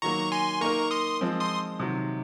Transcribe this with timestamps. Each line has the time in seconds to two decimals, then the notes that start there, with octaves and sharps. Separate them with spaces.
0.02 D#3 F#3 A#3 A#5 C#6
0.32 G#5 C6
0.61 A#3 D#4 A#4 A#5 C#6
0.91 C6 D#6
1.21 F3 G#3 C4
1.41 C6 D#6
1.80 C3 D#3 F#3